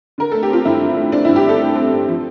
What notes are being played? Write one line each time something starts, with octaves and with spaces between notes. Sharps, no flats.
D3 A#4
A3 A4
G4
C4 F4
G2 E4
D3
A3
C4 D4
G2 E4
G4
D3 A4
A3
C4
G2
F3